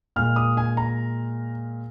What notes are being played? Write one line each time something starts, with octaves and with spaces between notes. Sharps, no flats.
A#2 G#3 F6
D#6
G#5
A#5